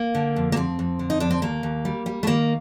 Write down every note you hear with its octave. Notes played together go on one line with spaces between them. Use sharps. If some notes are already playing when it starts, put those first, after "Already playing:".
Already playing: A#3
D3
F2
A#3
F2 C4
F2
D3
D#4
F2 D4
C4
D#2 A#3
D#2
G3
G3
A3
D#3 A#3